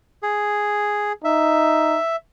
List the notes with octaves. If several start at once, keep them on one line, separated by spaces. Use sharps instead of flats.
G#4
D#4 E5